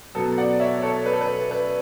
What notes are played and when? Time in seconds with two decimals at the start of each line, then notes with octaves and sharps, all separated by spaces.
0.15 B2 F#3 B3 A4
0.38 D5 F#5
0.60 C#5 E5
0.83 A4 C#5
1.06 B4
1.13 A4
1.21 B4
1.51 B4